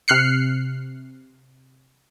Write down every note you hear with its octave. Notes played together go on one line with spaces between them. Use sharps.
C3 F6 F#6 C7 C#7